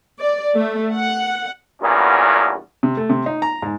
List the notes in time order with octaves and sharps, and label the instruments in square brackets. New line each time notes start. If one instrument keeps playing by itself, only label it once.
[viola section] D5
A3
F#5
[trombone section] E2 G2 A#2 D#3 B3 C#4
[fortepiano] C3
A3
C3
D#4
A#5
G#2